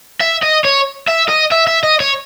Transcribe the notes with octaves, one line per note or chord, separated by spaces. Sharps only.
E5
D#5
C#5
E5
D#5
E5
E5
D#5
C#5